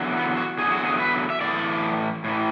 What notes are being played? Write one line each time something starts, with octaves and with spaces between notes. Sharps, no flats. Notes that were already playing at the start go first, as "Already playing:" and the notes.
Already playing: E2 D3 F#3
B3
F#4
E2 D3 F#3 G#4
F#4
G#4
B4
E5
A2 E3 D5
A2 E3